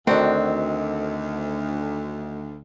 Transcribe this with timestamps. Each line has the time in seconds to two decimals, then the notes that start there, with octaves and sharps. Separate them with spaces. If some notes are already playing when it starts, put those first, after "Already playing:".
0.07 D2 D#3 A3 C4 D4 F#4